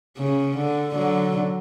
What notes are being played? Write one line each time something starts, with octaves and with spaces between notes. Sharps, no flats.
C#3
D3
D3 F#3